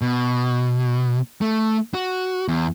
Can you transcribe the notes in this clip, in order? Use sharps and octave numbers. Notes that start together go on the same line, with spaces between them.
B2
A3
F#4
E2